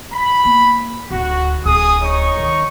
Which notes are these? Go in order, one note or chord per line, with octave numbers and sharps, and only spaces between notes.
B5
A#3
D1 D2 F#4
D1 D2 G#4 D#6
D#4 C#5 C#6
D#3